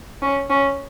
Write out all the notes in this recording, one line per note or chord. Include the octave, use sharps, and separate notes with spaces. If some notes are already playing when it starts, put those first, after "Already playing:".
C#4
C#4